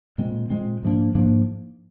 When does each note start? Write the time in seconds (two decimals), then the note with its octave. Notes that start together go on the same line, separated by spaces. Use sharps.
0.18 A#2 G#3 C4
0.50 A#2 G#3 C4
0.83 G#2 F3 A#3 D4
1.15 G#2 F3 A#3 D4